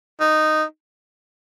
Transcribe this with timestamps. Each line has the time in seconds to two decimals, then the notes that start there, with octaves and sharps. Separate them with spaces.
0.20 D#4